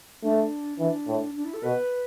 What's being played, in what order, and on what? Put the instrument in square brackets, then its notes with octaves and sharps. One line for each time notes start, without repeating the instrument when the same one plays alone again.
[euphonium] A3 [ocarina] D4
[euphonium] E3 [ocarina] D4
[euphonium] A2
[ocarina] D4
E4
A4
[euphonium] B2 [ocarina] B4